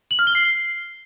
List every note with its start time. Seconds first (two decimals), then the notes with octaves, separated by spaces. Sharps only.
0.11 F#7
0.19 F6
0.27 G7
0.35 C7